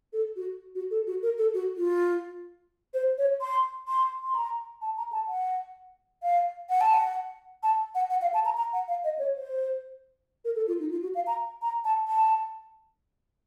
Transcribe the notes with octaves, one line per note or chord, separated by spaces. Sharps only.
A4
F#4
F#4
A4
F#4
A#4
A4
F#4
F4
C5
C#5
C6
C6
C6
A#5
A5
A#5
A5
F#5
F5
F#5
A5
F#5
A5
F#5
F#5
F5
A5
A#5
A#5
F#5
F5
D#5
C#5
C5
A#4
A4
F4
D#4
F4
F#4
F5
A#5
A#5
A5
A5